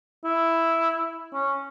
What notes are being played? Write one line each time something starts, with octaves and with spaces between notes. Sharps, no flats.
E4
C#4